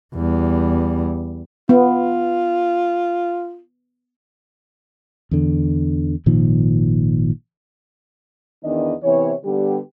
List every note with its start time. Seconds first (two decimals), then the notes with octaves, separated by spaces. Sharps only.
0.15 E2 G3
1.69 B3 F4
5.31 E2 D3
6.26 G#1 A#2 D#3 F3
8.63 E2 D#3 B3 D4 D#4 D#5
9.03 C3 E3 B3 C#5
9.45 D3 G3 B3 G4